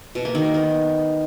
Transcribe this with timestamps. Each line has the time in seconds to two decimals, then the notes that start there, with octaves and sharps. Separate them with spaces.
0.15 B2
0.25 A#3
0.35 D#3
0.44 A#3
0.54 B3